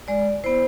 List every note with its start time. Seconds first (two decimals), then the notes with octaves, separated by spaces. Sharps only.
0.08 G#3 D5
0.44 B3 E4 C5